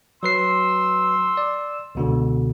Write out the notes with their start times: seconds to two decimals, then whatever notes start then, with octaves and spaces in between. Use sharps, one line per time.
0.23 F#3 B4 C6 E6 C7
1.37 D5
1.95 C#2 B2 D3